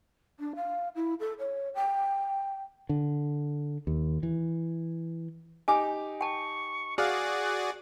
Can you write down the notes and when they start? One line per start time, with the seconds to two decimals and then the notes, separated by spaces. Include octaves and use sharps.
0.40 D4
0.56 F5
0.95 E4
1.20 A4
1.39 C#5
1.75 G5
2.89 D3
3.87 D#2
4.23 E3
5.68 D#4 G4 G#5 D6
6.21 G5 A5 C#6
6.98 F#4 G#4 D5 F5 F#6